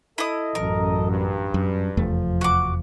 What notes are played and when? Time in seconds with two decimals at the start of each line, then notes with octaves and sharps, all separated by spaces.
0.18 E4 A4 D#5 D#6
0.55 A1 F#2 A#4
1.10 G2
1.54 F#2
1.97 F1 E2 F3 A3
2.41 F#4 D6